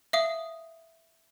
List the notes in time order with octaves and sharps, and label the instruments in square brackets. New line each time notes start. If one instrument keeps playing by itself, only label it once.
[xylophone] E5 F5 D#6